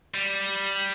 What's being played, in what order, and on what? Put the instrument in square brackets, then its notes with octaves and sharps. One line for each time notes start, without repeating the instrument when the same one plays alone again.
[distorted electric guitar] G3